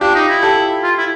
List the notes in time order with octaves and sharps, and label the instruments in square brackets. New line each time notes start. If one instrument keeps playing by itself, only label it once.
[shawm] D4 [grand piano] F4 G4
[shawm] D#4
E4
[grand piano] G4 A4
[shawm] F4
E4